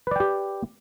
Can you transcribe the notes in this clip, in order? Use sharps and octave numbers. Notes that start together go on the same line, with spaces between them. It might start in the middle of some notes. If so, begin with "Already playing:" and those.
G4 B4 D5 G5